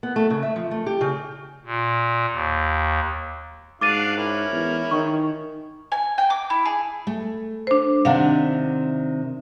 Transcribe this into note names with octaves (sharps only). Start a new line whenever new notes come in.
B3
A3
C#3
E5
F3
A3
G4
C#3
A#2
D#2
G#2 D4 F#4 F5 D6 A6 D#7
C#4 E4 A#4
E2
D#3 C#6
G#5
G5
D6
E4
G#4
A3
D4 C5
C3 D#3 D4 F5 F#5